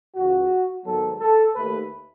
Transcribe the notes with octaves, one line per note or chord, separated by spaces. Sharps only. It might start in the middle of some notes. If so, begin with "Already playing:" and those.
C#2 C#3 E3 F#4
G#2 D#3 F#3 B3 A4
A4
D#2 D#3 A3 B4